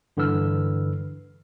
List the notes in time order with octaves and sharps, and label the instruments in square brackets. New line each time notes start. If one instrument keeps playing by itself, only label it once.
[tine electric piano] G2 D3 E3 B4 E6 F6